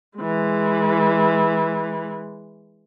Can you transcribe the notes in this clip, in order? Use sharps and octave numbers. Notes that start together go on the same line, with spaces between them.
E3 G#3